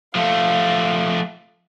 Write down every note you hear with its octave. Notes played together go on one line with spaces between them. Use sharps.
F3 A3 F5